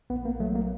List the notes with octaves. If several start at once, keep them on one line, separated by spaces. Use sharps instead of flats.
A#1 B3
A#3
F#3 A3
A#3